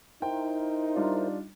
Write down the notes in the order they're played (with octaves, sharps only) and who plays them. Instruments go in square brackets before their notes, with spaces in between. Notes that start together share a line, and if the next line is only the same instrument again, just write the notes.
[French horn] D#4 [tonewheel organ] E4 A#4 C5 [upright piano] G5
[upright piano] G3 D4 F4